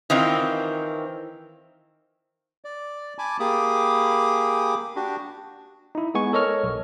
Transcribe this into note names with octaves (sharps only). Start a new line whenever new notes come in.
D#3 E3 C4 F4
D5
G#5 A5 B5 D6
A#3 G4 G#4 B5 D6 D#6
D4 F#4 G4
D#4 E4
G#3 B3 G#5 C#6
A4 A#4 C#5 D#5 C#6 F6
B1